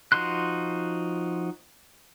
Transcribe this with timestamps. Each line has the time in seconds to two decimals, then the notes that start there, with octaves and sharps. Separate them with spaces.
0.12 F3 D#4 F#4 C6 F#6